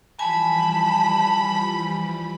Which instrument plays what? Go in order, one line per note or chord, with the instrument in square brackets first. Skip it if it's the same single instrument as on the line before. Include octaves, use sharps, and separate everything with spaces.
[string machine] E3 F3 G3 [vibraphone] G#5 [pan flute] A5 [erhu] B5